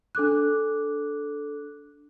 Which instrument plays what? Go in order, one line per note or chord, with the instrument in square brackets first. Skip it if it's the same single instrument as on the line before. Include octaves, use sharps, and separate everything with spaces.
[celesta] D4 A4 D6 F#6